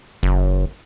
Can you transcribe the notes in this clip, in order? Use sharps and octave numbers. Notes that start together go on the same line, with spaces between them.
F#1